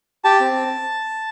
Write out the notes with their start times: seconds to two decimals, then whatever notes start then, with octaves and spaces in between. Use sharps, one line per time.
0.24 G4 A5
0.40 C4